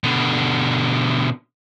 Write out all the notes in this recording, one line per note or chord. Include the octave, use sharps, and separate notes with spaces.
B2 D3